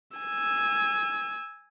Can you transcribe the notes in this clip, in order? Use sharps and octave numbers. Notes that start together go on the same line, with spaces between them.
G#5 E6